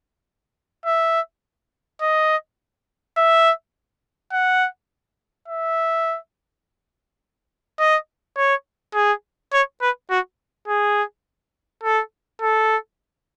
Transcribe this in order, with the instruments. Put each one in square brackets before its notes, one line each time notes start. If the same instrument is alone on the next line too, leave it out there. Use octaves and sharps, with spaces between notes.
[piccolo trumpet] E5
D#5
E5
F#5
E5
D#5
C#5
G#4
C#5
B4
F#4
G#4
A4
A4